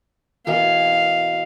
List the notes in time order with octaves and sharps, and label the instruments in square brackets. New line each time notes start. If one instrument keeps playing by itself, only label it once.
[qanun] B2 E3 A#4 [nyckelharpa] F5